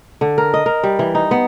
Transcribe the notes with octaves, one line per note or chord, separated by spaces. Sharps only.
D3
A#4
D#5
A#4
G3
E3
D#4
B3